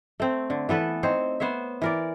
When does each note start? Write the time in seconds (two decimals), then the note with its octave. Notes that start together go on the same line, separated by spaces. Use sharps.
0.20 A3 C4
0.50 D3
0.69 E3 B3 A4 B4
1.03 C4 D#4 C5 C#5
1.40 B3 C5 C#5 E5
1.82 E3 A#4 D5